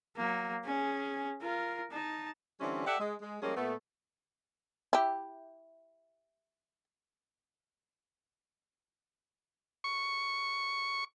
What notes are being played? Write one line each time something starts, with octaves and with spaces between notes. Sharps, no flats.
F#3 A#3
C#4 G#4
F4 A#4
D#4 A5
D3 E3 G3 C4 C#4
G4 A4 D5 E5 F#5
G#3
G#3
F3 G3 G#3 A#3 C#4 G#4
A#2 A3 B3
E4 G4
C#6